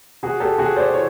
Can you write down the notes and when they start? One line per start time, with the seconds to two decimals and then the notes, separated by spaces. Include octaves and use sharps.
0.23 C3 F#4 G#4
0.40 G4 A4
0.58 C3 F#4 G#4
0.76 C5 D5
0.94 E3 C#5